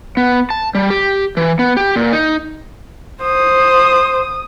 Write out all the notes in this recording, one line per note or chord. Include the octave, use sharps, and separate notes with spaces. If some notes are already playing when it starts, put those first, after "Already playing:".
B3
A5
G3
G4
E3
B3
G4
A#2
D#4
C5 D#6